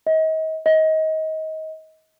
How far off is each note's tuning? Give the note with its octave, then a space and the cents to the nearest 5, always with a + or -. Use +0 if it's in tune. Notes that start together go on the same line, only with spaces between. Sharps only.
D#5 +35
D#5 +25